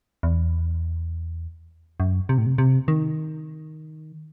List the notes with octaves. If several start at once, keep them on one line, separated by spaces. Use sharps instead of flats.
E2
F#2
C3
A2
C3
C3
D#3